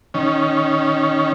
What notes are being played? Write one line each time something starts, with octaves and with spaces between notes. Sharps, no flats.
D#3 C#4